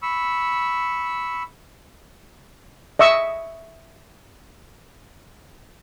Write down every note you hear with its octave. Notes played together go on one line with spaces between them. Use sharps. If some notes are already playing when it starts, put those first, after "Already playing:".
B5 C#6 E6
D#5 E5 C#6 E6